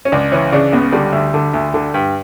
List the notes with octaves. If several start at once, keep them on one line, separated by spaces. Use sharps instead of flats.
C#4
C#2 D4
E3 C#4
C#3 D4
C#2 B3
D3 G3
D2
D3
D2
D3
G2